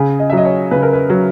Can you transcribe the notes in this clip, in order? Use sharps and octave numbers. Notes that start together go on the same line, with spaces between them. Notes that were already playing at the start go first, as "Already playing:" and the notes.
Already playing: C#3 G#4
D#5
E5
F#3
D#5
C#5
C#3 B4
A#4
B4
F#3